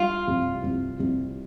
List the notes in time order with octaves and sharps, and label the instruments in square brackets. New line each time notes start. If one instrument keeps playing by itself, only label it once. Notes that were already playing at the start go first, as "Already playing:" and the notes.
Already playing: [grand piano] G3 [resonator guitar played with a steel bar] F4
[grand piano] C2
C2
C2